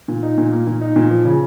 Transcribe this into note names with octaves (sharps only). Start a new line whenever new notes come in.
A#2
D#4
A#2
A#3
A#2
D#4
A#2
F3
C#3